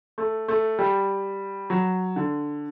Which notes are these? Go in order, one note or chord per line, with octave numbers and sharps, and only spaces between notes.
A3
A3
G3
F#3
D3